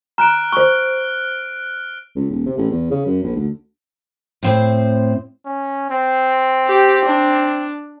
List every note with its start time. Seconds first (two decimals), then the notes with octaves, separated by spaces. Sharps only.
0.18 A#5 F6 F#6 D7
0.53 C5 C#6 G7
2.15 C#2
2.30 D#1
2.46 C3
2.58 A1
2.71 E2
2.91 C#3
3.06 F#2
3.23 A#1
3.35 D2
4.43 A2 C4 C5
5.45 C#4
5.90 C4
6.67 G4
7.06 D4